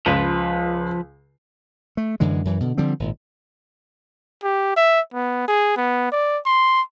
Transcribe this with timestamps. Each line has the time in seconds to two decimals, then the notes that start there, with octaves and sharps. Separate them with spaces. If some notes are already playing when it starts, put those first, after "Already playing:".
0.06 C#2 F3 B4
1.97 A3
2.20 F#2 D3 E3 G#3
2.45 F#2 E3
2.60 B2 D3
2.78 D3 F3 G3 C4
3.00 G#1 A#2
4.43 G4
4.77 E5
5.14 B3
5.48 G#4
5.77 B3
6.12 D5
6.46 C6